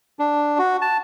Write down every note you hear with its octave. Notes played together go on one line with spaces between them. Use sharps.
D4
F#4
A5